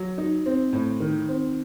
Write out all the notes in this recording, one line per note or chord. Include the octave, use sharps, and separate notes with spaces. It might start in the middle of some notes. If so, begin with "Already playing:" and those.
Already playing: F#3
D#4
C4
A2
D#3
C4